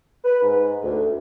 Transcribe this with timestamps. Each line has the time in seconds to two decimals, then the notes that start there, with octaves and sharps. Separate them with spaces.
0.24 B4
0.42 G#2
0.83 D2